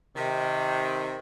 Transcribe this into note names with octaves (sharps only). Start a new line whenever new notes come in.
C3 D#3